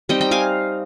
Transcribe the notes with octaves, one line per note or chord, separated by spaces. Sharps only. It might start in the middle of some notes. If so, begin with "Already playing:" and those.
G3 C4 D#4 D#5 G5
D#5 G5
F5 G#5